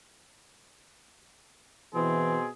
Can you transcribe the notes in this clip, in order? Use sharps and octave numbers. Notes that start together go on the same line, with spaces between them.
B2 E3 C4 G#4